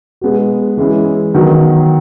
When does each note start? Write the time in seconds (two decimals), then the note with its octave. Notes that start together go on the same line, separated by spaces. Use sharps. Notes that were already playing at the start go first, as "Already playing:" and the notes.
0.21 B2 G#3 B3 F#4
0.77 E3 G#3 C#4 E4
1.34 D#3 F#3 B3